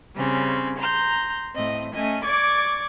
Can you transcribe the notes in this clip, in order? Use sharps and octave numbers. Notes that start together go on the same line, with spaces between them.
C#3 G3 C4 C#4
A#5 C6 G6
A2 C4 D#5
A3 C#4 D#5 G#5
D5 C#6 D6 G#6